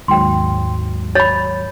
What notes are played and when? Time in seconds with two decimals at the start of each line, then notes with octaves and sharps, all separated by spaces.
0.08 D#2 G#2 F#3 G5 C6
1.15 C#5 B5 A6